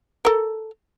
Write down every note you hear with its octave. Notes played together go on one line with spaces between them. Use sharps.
A4 A#4